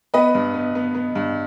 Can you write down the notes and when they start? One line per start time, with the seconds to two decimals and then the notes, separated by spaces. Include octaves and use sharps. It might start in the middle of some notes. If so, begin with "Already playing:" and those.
0.14 B3 B4 D#5
0.35 G2
0.54 B3
0.75 B3
0.95 B3
1.15 G2